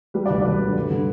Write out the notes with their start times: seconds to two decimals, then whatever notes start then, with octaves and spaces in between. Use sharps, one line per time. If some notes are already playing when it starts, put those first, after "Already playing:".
0.14 G3 B4
0.26 D5
0.30 D2 B4
0.41 D5
0.45 E1 B4
0.60 D3
0.75 G2
0.90 D3